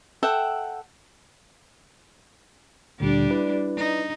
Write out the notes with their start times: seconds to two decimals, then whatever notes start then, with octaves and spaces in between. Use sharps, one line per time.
0.23 A4 E5 F#5 G5
3.00 D2 A#2 D3 G3 D4
3.31 E4 B4 D5
3.77 D#4